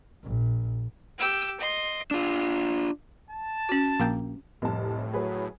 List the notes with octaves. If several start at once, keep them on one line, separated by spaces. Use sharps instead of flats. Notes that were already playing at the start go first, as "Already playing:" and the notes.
A#1
G4 E6
D#5 C6
D4 F4
A5
C#4 F#4
A#1 A#3 G5
F1 C2 A2 A5
F#3 G#4 B4